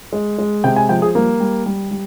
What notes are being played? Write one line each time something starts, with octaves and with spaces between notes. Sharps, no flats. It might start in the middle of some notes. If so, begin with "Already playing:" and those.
G#3
G#3
C3 G5
G#5
F3 G5
G#4
G3 A#3
G3
G3
G3